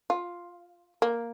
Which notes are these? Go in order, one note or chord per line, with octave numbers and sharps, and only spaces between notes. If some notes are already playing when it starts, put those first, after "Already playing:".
F4
A#3